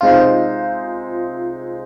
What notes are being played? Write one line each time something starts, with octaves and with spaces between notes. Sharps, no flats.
C3 G#3 D#4 F4 C5 D#5